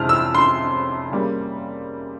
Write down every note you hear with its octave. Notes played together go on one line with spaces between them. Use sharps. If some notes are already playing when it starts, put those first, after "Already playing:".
Already playing: F2 C3 E3 G#3 C#4 F6
E6
C6
C#3 G3 A#3